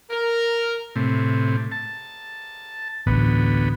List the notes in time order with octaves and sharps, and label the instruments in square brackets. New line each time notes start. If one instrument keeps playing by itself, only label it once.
[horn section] A#4
[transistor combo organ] A2 C3
A5
[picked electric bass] A1 [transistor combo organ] D2 B3